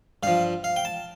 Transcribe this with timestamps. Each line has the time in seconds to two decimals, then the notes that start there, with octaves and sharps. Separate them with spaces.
0.23 G2 F3 F5
0.64 F5
0.76 G5
0.85 A5